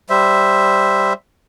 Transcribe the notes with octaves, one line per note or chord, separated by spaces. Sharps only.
G3 C5 E5